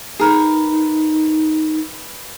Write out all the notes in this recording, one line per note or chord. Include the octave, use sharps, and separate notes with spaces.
D#4 G#4 A#4 B4